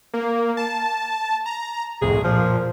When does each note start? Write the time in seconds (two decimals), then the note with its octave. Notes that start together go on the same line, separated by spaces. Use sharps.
0.14 A#3
0.57 A5
1.46 A#5
2.02 C2 F2 A2 G#4
2.24 A#2 F3